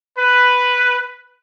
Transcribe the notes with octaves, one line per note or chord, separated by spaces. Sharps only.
B4